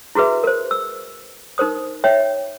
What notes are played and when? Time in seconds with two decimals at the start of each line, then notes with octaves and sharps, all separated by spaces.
0.15 E4 F#4 G#4 B4 E5
0.44 A#4 C5
0.71 E6
1.58 D#4 A#4 C5 D#6
2.04 C#5 E5 G5